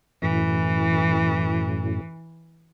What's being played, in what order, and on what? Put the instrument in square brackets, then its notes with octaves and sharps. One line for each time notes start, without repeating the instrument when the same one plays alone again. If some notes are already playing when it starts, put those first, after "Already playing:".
[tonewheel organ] F#2 A2 [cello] E3